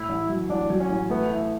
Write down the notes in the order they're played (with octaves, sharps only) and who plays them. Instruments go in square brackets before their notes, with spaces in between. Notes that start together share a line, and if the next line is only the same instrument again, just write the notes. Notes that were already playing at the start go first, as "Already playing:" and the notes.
Already playing: [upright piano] A2 [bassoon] E4
[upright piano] A1
F#3
[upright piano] A1 [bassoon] D4
[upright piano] F#3
[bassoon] C#4
[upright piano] A1
[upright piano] A3 [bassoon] B3
[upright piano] E4